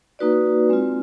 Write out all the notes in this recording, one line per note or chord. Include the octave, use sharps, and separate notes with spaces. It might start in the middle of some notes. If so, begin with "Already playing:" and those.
A#3 D#4 F#4 B4 D5
G#3 C4 F4